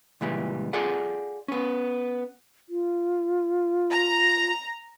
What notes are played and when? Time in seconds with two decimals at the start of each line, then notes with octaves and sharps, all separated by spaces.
0.21 C#2 A#2 E3 G3
0.73 F4 G#4 A4 D5 F#5
1.48 B3 C#4
2.69 F4
3.91 A#5